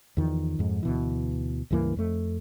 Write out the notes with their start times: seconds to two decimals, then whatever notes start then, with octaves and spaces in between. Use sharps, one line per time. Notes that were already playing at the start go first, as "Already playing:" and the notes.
0.17 E2 D#3 F3
0.59 F2 G#2
0.83 D2 B2 E3
1.71 C#2 G2 E3 A#3
1.96 F2 A3